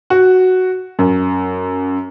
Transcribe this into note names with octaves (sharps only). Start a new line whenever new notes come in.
F#4
F#2